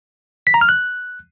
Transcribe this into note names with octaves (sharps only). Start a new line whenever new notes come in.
B6
A#5
F6
F#6